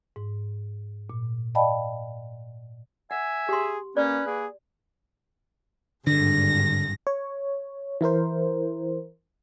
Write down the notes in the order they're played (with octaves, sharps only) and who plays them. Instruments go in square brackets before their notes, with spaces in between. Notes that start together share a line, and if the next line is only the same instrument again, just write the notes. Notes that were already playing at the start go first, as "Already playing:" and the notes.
[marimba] G#2
A#2
D5 D#5 F5 G5 A5 B5
[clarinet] E5 [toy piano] F#5 [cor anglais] G#5
[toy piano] G4 C6 [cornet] G#4
[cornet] A#3 [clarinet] C#4 [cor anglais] B4 [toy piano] D5
[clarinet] A#3 [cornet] G#4
[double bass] G#1 G2 [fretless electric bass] D3 [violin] A#6
[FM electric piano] C#5
E3 E4 A#4 C5